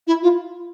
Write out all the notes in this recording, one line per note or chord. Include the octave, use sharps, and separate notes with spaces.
E4
F4